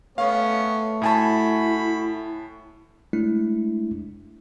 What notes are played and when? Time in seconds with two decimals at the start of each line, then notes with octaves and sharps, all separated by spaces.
0.18 A3 B3 C#4 C#5 F5
1.02 A2 E4 F#4 G#5 A5 B5
3.13 G#3 A3 D4 E4